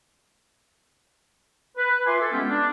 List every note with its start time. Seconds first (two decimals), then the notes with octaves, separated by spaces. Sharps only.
1.78 B4
2.07 F4 B4 E5 G#5 C6 D6
2.20 A4
2.32 G#3 B3 C#4 E4 F4 G4
2.50 D4